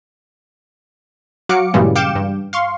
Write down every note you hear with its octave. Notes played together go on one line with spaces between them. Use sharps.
F#3 F#4 F5 D6 C#7
G2 A#2 C#3 E3 G3 G#3
F5 G5 D6 G6 C#7 E7
G2
F5 C6 C#6